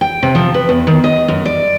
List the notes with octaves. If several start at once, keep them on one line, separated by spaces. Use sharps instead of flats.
G5
C3
F3
B4
E2
D#3
D#5
F#2
D5